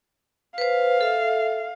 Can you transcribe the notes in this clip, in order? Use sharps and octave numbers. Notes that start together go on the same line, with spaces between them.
B4 C5 F5
A4 E5